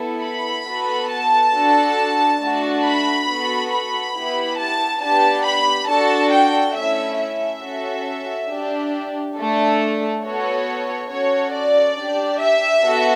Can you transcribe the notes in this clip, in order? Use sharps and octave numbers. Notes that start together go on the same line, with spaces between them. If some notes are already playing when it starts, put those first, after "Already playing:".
Already playing: B3 E4 A4
B5
B3 F#4 A4
A5
D4 F#4 A4
A3 D4 F#4
B5
B3 F#4 A4
B5
B3 E4 G4
A5
B3 D4 G4 A5
B5
D4 F#4 A4 A5
G5
A3 C#4 E4 E5
E5
C#4 F#4 A4
D4 G4
A3 D4 A4
B3 F#4 A4 C#5
C#4 F#4 A4 C#5
D5
D4 G4
E5
B3 F#4 A4